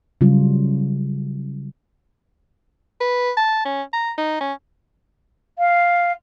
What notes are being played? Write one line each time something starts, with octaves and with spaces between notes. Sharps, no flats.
C#3 F#3 G3 F4
B4
A5
C#4
A#5
D#4
C#4
F5